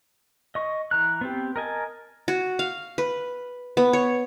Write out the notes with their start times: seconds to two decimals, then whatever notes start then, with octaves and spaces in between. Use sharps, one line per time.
0.55 D#5 C#6
0.91 E3 A#5 F#6
1.21 B3 C4 G4
1.56 A#4 D#5 G#5 A5
2.28 F#4
2.59 F5
2.98 B4
3.77 B3
3.93 C#5